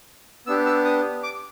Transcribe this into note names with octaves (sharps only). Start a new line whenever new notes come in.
B3 D4 G4 E6
E6
D#6
D6